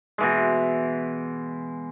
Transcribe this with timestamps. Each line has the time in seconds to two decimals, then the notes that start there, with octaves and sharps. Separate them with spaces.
0.18 B2 E3 G#3